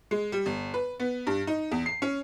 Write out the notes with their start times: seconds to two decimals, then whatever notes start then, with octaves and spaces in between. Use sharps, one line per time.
0.11 G#3
0.32 G3
0.46 G1
0.74 B4
1.00 B3
1.27 G2
1.47 D#4
1.72 E2
1.86 C7
2.02 C#4